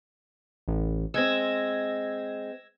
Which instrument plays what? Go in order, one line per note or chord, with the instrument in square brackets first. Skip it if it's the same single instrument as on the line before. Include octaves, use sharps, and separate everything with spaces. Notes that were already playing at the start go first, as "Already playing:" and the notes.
[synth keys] A1
[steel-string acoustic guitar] G#3 C4 [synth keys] E6 G#6 A#6